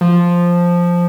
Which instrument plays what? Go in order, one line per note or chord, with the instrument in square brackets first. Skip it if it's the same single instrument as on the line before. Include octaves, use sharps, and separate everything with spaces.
[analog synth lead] F3